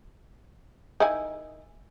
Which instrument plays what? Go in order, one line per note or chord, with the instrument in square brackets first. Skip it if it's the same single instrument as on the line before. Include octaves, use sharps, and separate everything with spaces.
[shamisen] D#3 E4 G#5